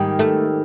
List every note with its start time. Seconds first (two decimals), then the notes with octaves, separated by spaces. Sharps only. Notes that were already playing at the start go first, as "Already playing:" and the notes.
Already playing: G#2 D#3 G3 A#3 D#4
0.19 A3